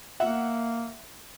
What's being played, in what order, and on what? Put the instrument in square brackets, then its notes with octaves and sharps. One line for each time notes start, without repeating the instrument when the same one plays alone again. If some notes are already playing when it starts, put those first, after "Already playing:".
[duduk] A#3 [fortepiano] E5 F#5